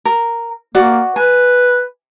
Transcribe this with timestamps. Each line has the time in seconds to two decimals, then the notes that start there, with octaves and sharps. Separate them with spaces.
0.05 A#4
0.75 A#3 F#4 D5
1.16 B4 G#5